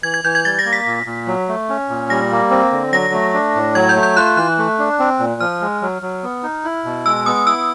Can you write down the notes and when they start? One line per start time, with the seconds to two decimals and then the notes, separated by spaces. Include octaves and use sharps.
0.03 E3 G#6
0.14 G#6
0.24 E3 G6
0.35 G#6
0.45 G3 A6
0.59 A#6
0.65 A#3
0.73 B6
0.87 A#2
1.06 A#2
1.27 F#3
1.49 A3
1.69 C#4
1.89 A#2
2.10 G3 A#6
2.31 A#3
2.51 C4
2.71 D3
2.92 F#3 A#6
3.13 A3
3.34 D4
3.55 A2
3.75 F#3 G#6
3.89 G6
3.96 A3
4.03 G6
4.17 F4 F#6
4.37 E3 F#6
4.58 A3
4.79 D4
4.99 C4
5.19 A#2
5.40 F3 F6
5.61 G#3
5.82 F#3
6.02 F#3
6.23 B3
6.43 D#4
6.65 E4
6.85 B2
7.06 G#3 E6
7.26 B3 D#6
7.47 E4 E6